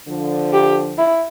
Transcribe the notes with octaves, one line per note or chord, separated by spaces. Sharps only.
D3 F3
G4
E4